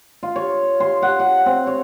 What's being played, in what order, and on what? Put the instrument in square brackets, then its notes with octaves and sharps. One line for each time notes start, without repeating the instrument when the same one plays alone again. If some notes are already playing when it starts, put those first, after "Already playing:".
[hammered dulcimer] F4
C#5
C6
F#5
F#5
C4
C#5